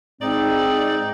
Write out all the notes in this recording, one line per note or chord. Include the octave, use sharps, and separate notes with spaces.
G#2 C4 D#4 D5